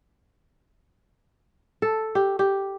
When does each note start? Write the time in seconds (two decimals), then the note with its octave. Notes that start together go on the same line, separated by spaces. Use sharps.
1.82 A4
2.15 G4
2.39 G4